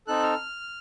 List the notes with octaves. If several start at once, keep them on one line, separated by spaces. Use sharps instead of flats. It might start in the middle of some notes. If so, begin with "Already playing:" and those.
C4 D#4 A4 F#6
F6